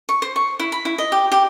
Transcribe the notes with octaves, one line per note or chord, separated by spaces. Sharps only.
C#6
C5
C#6
E4
B5
E4
D#5
G4
G4